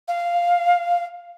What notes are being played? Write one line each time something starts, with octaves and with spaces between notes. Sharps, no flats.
F5